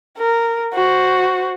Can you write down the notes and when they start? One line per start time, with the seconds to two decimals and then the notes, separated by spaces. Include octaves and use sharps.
0.18 A#4
0.74 F#4 C5